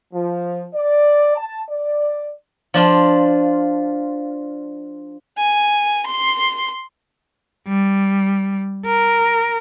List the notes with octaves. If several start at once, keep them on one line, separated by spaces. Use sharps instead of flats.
F3
D5
A5
D5
F3 D4 F4
G#5
C6
G3
A#4